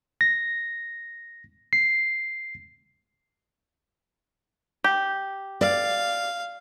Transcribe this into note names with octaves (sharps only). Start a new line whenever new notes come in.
A#6
C7
G4
D5 F5